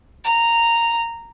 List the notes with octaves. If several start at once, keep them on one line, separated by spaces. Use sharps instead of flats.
A#5